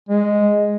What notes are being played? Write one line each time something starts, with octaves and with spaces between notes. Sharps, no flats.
G#3